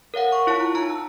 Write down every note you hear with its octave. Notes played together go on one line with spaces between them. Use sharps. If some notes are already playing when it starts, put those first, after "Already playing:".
A#4 C#5 F5 F#5
C#6
E4 F4 C#5 A5
A#5
D#4 A5 A#5
E6